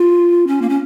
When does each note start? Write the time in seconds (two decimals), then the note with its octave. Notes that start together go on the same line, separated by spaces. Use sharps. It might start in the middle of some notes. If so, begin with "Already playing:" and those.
Already playing: F4
0.47 C#4
0.62 A#3
0.69 C#4